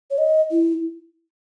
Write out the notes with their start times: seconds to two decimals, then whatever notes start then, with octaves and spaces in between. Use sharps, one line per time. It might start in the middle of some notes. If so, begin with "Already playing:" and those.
0.11 C#5
0.18 D#5
0.51 E4